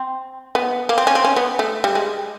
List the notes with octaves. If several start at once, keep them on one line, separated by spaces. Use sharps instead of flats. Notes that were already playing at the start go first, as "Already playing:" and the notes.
Already playing: C4
B3
A#3
C4
C#4
C4
C#4
B3
A3
G3
G#3